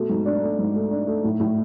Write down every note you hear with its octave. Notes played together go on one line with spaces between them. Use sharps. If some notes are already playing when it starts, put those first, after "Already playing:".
Already playing: B2 A3
G#2
D4
A3
G#2
A3
D4
A3
A2
A2